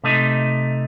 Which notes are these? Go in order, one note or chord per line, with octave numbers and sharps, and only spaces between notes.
C3 A3 D#4